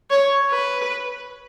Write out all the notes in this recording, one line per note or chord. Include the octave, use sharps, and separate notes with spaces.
C#5
B4